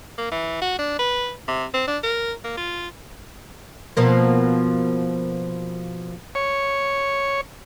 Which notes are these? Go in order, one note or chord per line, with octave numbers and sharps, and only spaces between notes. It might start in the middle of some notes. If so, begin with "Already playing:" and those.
A#3
E3
F#4
D4
B4
C3
C4
D4
A#4
A#3
F4
B2 F3 A#3
C#5